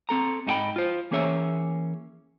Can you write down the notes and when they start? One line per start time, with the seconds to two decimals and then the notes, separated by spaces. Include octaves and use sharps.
0.09 C4 A4 A#5
0.47 G#2 D#4 F4 G#4 G5 B5
0.76 F4 C5
1.11 E3 A#3 C#4 G#4 C#5 E5